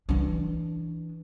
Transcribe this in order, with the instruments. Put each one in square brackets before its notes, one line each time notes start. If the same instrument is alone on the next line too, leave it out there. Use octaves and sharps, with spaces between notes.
[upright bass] E3 D4